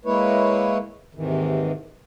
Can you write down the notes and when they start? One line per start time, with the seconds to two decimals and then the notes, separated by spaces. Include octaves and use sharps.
0.05 G#3 A#3 E4 B4 C#5
1.15 D#2 G#2 C3 D#3 E3